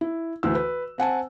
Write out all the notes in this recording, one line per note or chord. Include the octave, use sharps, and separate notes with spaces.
E4
D2 E3 E6
B4
C4 F#5 G#5 A5